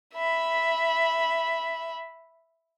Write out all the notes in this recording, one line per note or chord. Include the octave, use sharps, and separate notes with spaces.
E5 B5